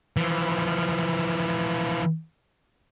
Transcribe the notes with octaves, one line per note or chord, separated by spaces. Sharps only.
E3 F3